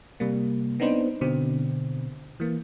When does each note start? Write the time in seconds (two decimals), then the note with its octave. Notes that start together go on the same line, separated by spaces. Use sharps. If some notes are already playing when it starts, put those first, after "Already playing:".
0.20 C3 G3 A#3
0.80 B3 C4 D4 D#4 B4 C5
1.21 B2 D3 C4
2.40 E3 A#3